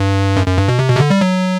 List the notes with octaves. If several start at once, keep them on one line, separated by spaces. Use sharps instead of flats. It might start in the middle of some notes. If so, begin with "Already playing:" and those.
Already playing: G2
F#2
F#2
G2
B2
C3
B2
C3
D3
G3
F#3